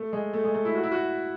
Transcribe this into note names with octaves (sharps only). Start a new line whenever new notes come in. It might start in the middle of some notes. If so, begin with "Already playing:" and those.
Already playing: A3
G#3
A3
G#3
A3
E4
F#4
E4
F#4